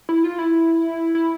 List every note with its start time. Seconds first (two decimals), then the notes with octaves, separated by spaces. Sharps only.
0.09 E4
0.24 F4
0.39 E4
1.15 E4